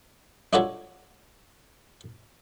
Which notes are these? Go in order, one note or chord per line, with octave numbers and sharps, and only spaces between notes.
D4 D#4 F4 F#4 A4 C#5